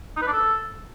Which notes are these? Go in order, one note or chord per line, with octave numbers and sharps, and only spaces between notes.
D#4
B4
D4
A4